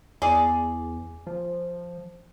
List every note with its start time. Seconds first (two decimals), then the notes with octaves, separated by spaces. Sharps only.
0.22 E2 G#4 D5
1.27 F3